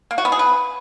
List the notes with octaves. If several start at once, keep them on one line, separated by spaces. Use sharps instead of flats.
A#3
F#4
B3
G#4
B4